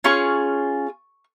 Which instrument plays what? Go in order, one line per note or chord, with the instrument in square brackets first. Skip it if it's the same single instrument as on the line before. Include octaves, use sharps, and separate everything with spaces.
[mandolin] C#4 F4 G#4 C#6